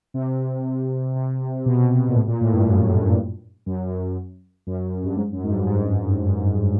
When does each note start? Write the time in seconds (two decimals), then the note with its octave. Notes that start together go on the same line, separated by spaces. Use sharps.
0.14 C3
1.16 C3
1.66 B2
2.09 A#2
2.16 A2
2.28 A#2
2.41 A2
2.54 G2
2.66 F#2
2.82 G2
2.99 G2
3.66 F#2
3.87 F#2
4.67 F#2
5.04 G2
5.16 G#2
5.33 F#2
5.44 G#2
5.50 G2
5.67 G#2